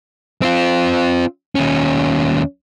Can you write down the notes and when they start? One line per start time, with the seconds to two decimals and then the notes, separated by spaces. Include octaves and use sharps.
0.42 C4 F4
1.55 D#2 C#4